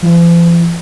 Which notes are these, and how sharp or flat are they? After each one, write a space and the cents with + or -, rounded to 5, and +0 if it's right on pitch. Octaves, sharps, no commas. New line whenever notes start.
F3 -45